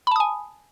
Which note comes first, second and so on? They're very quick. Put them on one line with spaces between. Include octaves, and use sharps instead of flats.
B5 A5 D#6 G#5